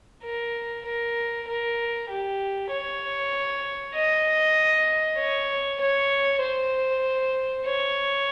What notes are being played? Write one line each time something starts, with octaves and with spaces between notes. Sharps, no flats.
A#4
A#4
A#4
G4
C#5
D#5
C#5
C#5
C5
C#5